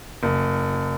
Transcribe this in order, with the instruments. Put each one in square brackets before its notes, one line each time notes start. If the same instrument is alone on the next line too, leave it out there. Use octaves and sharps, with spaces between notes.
[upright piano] F#1